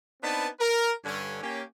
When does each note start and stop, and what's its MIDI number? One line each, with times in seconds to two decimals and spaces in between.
0.22 0.47 59
0.22 0.47 60
0.22 0.47 62
0.22 0.47 63
0.22 0.47 71
0.22 0.47 81
0.60 0.92 70
1.04 1.39 43
1.04 1.39 50
1.04 1.39 61
1.42 1.62 58
1.42 1.62 61
1.42 1.62 67